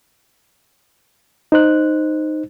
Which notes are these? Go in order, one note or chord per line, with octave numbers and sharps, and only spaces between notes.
D#4 C5 F#6